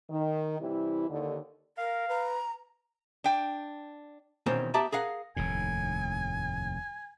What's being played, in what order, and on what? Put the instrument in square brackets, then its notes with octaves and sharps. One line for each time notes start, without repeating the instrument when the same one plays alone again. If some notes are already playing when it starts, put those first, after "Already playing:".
[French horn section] D#3
C3 E3 G3 E4
D#2 D3
[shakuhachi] A#4 [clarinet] F5
[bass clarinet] B4 [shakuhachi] A#5
[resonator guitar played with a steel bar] D4 G5
[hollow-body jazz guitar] E2 B2 D#3 C4 C#4 C5
B3 G4 D5 E5 A5 A#5
G#4 A#4 F5 F#5
[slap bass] F1 D#2 A2 [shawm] G#5